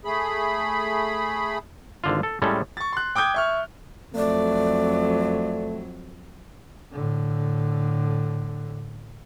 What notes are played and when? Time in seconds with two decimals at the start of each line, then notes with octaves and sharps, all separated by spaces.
0.05 A3 G#4 B5
2.04 G#1 D3 F4
2.23 A4
2.42 A2 G3 G#3 C#4 A4
2.77 C#6 A6
2.93 C6 F#6
3.15 G5 D6 D#6 G6 G#6
3.34 E5 C#6 F6
4.16 F2 F#3 A3 D5
6.93 A2 D3